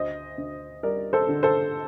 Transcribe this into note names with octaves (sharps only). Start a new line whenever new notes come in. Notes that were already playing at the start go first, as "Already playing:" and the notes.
Already playing: D2 C5 D#5
D2
G3 A#4 D5
A4 C5
D3
A4 C5